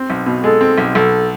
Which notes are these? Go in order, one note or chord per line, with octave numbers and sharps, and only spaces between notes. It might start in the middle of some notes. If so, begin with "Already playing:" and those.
Already playing: C4
B1
B2
G#3 A4
C4
B1
B1 A4